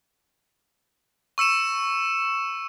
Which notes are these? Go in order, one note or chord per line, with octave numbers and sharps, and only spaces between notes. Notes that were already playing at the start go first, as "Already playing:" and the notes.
C#6 E6 C#7 E7